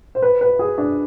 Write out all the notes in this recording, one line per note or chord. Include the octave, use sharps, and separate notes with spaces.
C5
B4
B4
G#4
D4